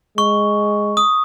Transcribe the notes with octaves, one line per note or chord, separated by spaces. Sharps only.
G#3 C#6
D#6